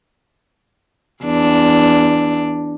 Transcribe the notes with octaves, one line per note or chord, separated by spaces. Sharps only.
E2 D4